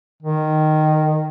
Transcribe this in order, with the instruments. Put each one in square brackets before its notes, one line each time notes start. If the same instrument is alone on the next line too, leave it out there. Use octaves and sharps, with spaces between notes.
[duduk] D#3